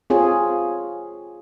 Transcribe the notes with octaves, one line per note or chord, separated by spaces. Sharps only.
C4 F4 G#4 C#5